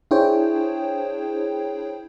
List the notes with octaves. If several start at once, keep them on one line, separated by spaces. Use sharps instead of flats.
D4 E4 G#4 C5 C#5 G5